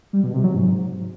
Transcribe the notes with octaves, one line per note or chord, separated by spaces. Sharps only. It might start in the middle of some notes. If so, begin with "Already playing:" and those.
G3
B2
C3
F#3
G#2